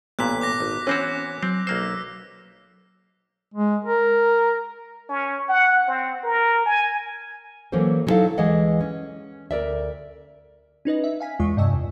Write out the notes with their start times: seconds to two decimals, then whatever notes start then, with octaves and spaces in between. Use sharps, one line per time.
0.19 A1 G2 A#2 B3 F#6 B6
0.41 D6 F#6 A#6
0.60 G#1
0.87 E3 C4 C#4 F#4
1.43 F#3 C4
1.67 B1 A#3 C5 E6
3.54 G#3
3.85 A#4
5.09 C#4
5.49 F#5
5.88 C4
6.24 A#4
6.66 G#5
7.72 E3 F#3 A#3 C#4 A4 C5
8.07 F#3 B3 D#4 E4 A4 F5
8.38 D2 E3 G#3 D#5 F#5
8.81 C#4
9.51 D2 A#4 D5 E5
10.85 C#4 D#4 B4 D#5
11.04 E5
11.20 F5 G#5 B6
11.39 E2 G#3 F4 C#6
11.57 G2 C3 D#5 G#5 E6
11.73 E2